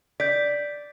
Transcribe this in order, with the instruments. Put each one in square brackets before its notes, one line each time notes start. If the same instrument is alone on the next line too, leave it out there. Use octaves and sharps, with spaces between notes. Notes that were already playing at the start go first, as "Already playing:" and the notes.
[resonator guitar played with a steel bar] D5 [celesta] G6 B6